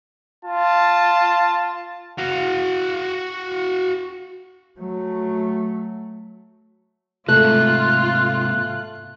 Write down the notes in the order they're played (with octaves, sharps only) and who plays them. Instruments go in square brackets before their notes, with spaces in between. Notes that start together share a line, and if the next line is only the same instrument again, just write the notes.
[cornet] F4 [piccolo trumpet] A5
[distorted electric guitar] F#4 F5
[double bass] F#3 A3
[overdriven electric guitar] G#2 C3 [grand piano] A3 [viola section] F4 [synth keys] F#6